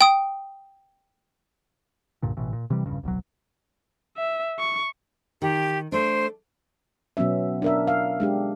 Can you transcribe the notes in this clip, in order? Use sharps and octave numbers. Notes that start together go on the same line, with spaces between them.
G5 D#6
C2 G2 A#2 D3
A1 B2 E3
A#2
C3 E3 G3
E1 C#2 G2 C#3
D1 B1 C3 F#3
E5
C#6
D#3 G4
A3 D4 C5
B2 F#3 B3 C#4 E5
D4 A#4 E5
A#4 F5
G#3 D4 G4